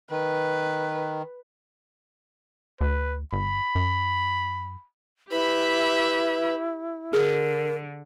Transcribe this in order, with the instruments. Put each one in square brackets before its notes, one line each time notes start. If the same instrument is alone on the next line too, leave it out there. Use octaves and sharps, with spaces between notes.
[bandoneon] D#3 [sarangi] B4
[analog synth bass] D2 [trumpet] B4
[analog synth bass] G1 [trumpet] B5
[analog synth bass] F#2
[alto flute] E4 [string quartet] G4 E5 B5 [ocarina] B4
[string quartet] D3 [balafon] G#4 [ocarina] A#4